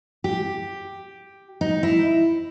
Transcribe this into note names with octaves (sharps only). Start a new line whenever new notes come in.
G4
D#4
E4